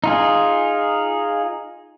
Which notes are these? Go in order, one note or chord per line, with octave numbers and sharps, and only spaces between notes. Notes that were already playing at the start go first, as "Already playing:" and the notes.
D#4 F4 G#4